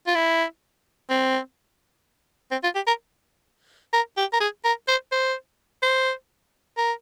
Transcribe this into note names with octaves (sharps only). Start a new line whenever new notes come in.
F4
E4
C4
C4
F4
G4
A#4
A#4
G4
A#4
G#4
A#4
C5
C5
C5
A#4